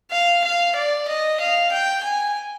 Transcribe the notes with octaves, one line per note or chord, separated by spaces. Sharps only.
F5
F5
D5
D#5
F5
G5
G#5